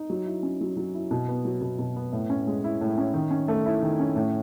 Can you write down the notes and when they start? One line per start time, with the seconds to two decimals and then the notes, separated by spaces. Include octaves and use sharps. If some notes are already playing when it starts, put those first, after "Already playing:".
Already playing: D#4
0.10 F#3
0.26 E4
0.43 C#4
0.61 F#3
0.77 F#3
0.94 E4
1.11 B2
1.29 B3
1.45 F#3
1.62 B2
1.79 B2
1.96 B3
2.12 A2
2.30 C#4
2.47 G#3
2.64 E4
2.81 A2
2.98 C#4
3.14 D#3
3.31 C#4
3.48 A3
3.66 E4
3.83 D#3
3.99 C#4
4.16 A2